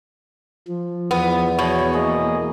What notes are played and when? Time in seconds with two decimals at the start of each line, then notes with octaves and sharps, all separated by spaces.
0.68 F3
1.11 E2 B3
1.59 B2 C#5
1.94 A#3 G#4 D#5